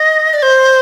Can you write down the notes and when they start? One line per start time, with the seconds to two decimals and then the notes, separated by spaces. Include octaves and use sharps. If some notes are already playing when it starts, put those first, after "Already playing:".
Already playing: D#5
0.33 D5
0.43 C5